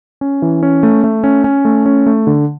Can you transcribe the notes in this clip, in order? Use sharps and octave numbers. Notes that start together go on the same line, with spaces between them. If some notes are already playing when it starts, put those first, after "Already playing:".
C#4
E3
C#4
A3
A3
C#4
C#4
A3
C#4
A3
D3